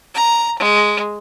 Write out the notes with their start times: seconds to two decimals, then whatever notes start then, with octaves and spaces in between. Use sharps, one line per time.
0.15 A#5
0.59 G#3